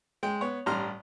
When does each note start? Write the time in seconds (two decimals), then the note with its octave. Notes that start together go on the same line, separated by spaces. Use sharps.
0.23 G#3 G5
0.41 B3 C#5
0.66 A1 G2 G3 A#5 C6 F6